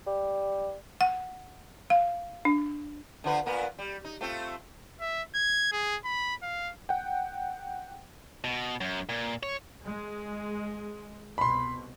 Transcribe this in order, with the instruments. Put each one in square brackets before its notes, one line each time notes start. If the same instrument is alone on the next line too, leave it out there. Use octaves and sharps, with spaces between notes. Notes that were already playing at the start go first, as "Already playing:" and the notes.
[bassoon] G3
[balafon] F#5
F5
D4
[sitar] D3 F3 B4
A#2 B3 A#4
G3
D#4
A3 C4 F4
[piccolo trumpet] E5
G#6
G#4
B5
F5
[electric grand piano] F#5 G5
[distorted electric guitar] B2
F#2
A#2
C#5
[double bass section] G#3
[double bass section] C2 B2 [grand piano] B5 C6